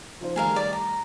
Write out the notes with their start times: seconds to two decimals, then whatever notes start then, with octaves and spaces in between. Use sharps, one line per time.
0.21 F3 D#4 C5
0.36 D#3 G3 A3 G#4 A#4 F5
0.56 D5
0.73 A#5